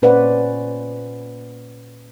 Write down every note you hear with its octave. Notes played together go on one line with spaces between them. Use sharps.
A#2 C#4 B4 C5 D5 F#5